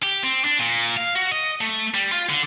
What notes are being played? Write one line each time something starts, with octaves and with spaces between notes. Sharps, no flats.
G4
C4
D4
A#2
F5
F#4
D#5
A3
G3
F4
D3